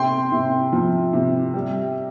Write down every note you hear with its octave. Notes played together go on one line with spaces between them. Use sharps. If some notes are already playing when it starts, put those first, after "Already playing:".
Already playing: C3 G5 C6
C3
F3
C3
G3